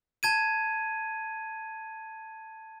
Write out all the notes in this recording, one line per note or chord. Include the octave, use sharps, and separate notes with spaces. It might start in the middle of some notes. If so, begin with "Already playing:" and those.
A5 G#6 D#7